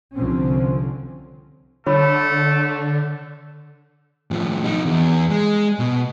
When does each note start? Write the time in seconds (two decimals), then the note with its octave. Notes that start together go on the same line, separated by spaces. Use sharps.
0.14 C2 D3 F3 C4 C#4
1.86 D3 A3 C#5 B5
4.31 A2 F3
4.65 D#4 F#4
4.86 E2
5.31 G#3
5.79 B2